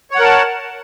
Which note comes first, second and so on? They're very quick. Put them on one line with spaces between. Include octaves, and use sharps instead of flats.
C#5 F#5 A#4 A5